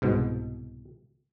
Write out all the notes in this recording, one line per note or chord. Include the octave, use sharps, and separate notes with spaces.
C2 G#2 B2